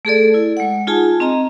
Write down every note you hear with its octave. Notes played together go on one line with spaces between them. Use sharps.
A3 G#4 A4 D5
E4
G#3 F#5
D#4 F4 G#4 G#5 A5
C4 D#5 A#5